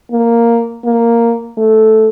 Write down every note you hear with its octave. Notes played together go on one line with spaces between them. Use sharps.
A#3
A#3
A3